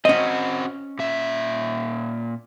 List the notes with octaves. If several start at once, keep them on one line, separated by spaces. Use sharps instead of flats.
C4 C#4 F#4 D#5
A#2 E5